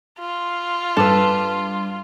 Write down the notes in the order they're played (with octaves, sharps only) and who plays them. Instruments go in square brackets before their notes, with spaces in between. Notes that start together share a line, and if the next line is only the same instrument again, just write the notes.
[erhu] F4
[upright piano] G2 D6 [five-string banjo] A4 B4